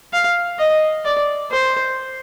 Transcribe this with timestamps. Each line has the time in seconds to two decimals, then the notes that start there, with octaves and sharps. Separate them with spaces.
0.13 F5
0.58 D#5
1.05 D5
1.51 C5